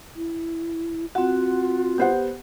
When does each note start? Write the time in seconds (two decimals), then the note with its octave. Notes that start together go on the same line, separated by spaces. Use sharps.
0.16 E4
1.15 C4 F4 F#4 F#5
1.98 B3 G4 C5 F#5